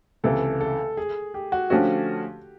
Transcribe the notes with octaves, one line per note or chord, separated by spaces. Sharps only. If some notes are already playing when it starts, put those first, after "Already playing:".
C#2 C3 E3 A4
A4
G#4
G4
F#4
D3 F3 A3 C#4 F#4 G4